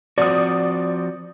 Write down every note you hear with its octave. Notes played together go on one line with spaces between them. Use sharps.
F3 C4 F#4 D5 D#6